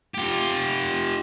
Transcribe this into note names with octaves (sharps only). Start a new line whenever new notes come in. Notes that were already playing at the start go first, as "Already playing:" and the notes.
F4 G4